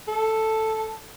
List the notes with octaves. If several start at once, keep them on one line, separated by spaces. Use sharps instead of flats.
A4